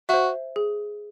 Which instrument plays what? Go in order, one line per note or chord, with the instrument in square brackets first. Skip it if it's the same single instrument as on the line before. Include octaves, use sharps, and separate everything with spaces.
[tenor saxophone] F#4 [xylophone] C5 E5
[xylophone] G#4